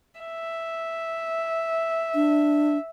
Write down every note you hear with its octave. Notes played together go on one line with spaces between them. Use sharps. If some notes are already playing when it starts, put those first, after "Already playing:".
E5
D4